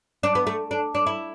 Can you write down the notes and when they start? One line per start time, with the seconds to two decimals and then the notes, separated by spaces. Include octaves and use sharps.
0.23 D4
0.35 B3
0.47 A3
0.71 D4
0.95 D4
1.06 E4